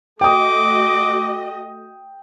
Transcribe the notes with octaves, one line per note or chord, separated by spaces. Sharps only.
A3 F#4 D#5 G5 D6 D#6